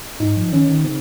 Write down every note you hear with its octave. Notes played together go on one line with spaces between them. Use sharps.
G#2 D#4
F3
D#3 C#4
D#3
C#3 C4